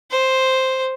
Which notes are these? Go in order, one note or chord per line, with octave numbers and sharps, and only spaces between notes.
C5